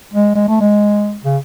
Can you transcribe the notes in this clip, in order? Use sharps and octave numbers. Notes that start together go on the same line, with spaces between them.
G#3
G#3
A3
G#3
C#3